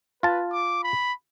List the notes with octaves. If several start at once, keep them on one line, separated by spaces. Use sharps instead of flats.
F4 B4 A5
D6
B5